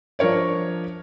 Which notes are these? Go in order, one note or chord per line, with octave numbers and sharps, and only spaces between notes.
F3 D4 A#4 C#5 D5